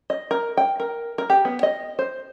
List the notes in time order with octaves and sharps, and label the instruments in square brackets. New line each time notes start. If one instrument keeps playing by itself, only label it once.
[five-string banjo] D#5
A#4
G5
A#4
A#4
G4
B3
D#5
C5